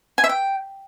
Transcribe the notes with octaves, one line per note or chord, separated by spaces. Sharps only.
G#5
E5
G5